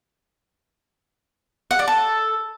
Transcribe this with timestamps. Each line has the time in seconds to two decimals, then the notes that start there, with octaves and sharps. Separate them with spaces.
1.71 F#5
1.79 D5
1.88 A4